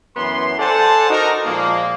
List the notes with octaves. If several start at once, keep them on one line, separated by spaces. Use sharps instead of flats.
F#2 E3 B3 C6
A4 C5 D5 F#5 G#5 A5
D#4 F#4 A#4
A#2 F3 G#3 A#3